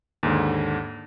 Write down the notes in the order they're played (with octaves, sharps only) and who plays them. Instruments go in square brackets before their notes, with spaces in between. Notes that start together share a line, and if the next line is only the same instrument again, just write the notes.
[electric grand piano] D#2 G#2 D3